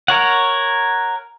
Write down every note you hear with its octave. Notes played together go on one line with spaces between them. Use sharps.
A#4 C#5 F#5